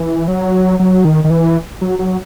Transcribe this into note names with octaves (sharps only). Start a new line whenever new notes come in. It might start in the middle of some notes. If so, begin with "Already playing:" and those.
Already playing: E3
F#3
F#3
D#3
D#3
E3
F#3
F#3